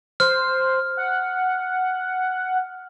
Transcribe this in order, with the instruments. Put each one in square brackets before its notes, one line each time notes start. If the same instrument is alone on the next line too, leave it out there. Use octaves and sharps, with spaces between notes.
[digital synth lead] C5 [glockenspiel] F6
[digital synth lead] F#5